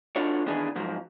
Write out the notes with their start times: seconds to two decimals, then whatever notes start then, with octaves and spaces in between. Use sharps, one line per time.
0.16 D4 F4 F#4 A4 C#5
0.46 D#3 E3 B3 D4 G#4
0.76 G#2 F3 F#3